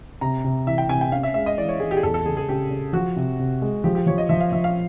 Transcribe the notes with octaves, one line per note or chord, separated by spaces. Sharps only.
C3 A#5
C3
E3 E5
G5
C3 G#5
G5
C#4 F5
E5
G#3 E5
D#5
E3 D5
C#5
E3 G#4
G4
G#4
E2 A4
A4
C#3 G#4
G#4
C#3 G4
C#3
F3 F#4
C3
C3
G#3
F3 G4
G4
F3 C#5
D#5
F3 E5
F5
F3 E5
F5